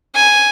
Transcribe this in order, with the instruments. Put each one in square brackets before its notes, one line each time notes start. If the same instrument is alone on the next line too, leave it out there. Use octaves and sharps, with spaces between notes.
[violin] G#5